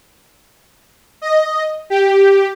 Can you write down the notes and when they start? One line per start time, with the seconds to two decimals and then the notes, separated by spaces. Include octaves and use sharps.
1.22 D#5
1.90 G4